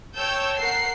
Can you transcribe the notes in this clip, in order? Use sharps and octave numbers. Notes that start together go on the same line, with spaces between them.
C#5 G5 A5 E6 G6
A#4 F#5 C7